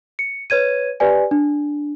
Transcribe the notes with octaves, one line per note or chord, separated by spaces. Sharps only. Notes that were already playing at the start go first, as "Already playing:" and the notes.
C#7
B4 C#5 G#6 D#7
G4 B4 D5 G#5
D4